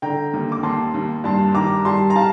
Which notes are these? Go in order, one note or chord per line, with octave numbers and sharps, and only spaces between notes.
D3 G5 A#5
D#2
D6
D#2 A5 C6
D#2
G2 A5 C6
D#3 A#5 D6
G3 A5 C6
A#5
F5 A5